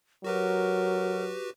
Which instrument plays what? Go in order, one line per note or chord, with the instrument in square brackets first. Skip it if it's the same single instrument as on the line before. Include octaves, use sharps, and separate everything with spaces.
[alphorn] F#3 [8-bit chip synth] F#4 G4 B4 [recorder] A#4